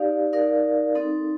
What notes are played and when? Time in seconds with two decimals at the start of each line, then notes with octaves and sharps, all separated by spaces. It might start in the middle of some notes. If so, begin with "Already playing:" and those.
Already playing: D#4 G4 D5 F5
0.33 D#4 A#4 D5 F5
0.95 C4 D#4 A4